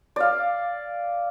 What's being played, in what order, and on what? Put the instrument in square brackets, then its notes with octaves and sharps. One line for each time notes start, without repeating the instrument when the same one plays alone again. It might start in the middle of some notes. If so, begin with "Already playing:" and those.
[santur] D5 F5